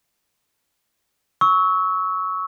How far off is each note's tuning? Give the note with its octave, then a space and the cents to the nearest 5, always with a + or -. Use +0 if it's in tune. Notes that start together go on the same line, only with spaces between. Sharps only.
C#6 +10 E6 -25